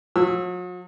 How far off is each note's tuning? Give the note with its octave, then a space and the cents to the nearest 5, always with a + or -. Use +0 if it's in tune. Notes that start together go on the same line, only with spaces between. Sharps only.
F#3 -45 E6 +0